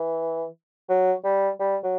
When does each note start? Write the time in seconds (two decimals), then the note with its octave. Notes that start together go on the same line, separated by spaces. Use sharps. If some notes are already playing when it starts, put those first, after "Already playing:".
Already playing: E3
0.89 F#3
1.25 G3
1.60 G3
1.84 F#3